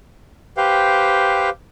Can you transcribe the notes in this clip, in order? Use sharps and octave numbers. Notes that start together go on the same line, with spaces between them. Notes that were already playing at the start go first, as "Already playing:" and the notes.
G4 B4 C5 F5 G5